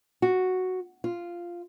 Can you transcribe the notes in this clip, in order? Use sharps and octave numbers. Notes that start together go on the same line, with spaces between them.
F#4
F4